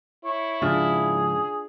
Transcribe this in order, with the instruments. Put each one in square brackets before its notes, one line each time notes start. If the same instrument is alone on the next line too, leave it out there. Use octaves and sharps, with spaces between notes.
[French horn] E4 [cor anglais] C#5
[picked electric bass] G#2 C#3 F3 [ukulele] D4 F4 [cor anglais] G#4